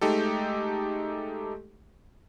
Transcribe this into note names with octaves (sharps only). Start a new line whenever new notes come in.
G#3 A3 D#4 G4 A4